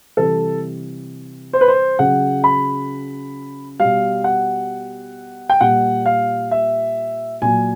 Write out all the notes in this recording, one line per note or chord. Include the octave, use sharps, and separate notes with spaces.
C3 E3 G3 A4
C5
B4
C5
C#3 F#3 F#5
B5
B2 G3 F5
F#5
G5
A#2 G3 F#5
F5
E5
A#2 F#3 G#5